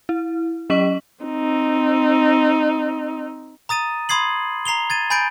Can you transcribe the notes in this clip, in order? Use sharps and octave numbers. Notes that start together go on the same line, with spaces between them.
E4
F#3 C#4 D#5 C#6 B6 F#7
C4 D#4
A#5 D#6 A6 D#7
B5 C6 D#6 G#6 C7 F#7
A#5 C7 F7 G7
G#6 A6 D#7
G#5 B5 G6 A6 D7